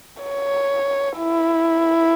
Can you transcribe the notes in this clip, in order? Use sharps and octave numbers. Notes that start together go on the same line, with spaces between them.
C#5
E4